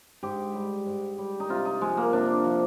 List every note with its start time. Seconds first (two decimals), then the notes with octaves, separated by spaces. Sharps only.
0.23 G#2 G4
0.54 G3
0.86 G#2
1.18 G3
1.40 D#4
1.49 C3 F4
1.65 D#4
1.81 F3 G#3
1.97 A#3
2.13 C3 D4
2.45 F3